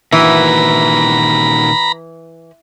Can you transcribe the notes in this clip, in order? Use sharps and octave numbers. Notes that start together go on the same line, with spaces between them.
A#2 D#3 E3 F#4 A#5 B5